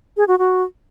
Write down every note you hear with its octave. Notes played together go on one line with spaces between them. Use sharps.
G#4
F#4
F#4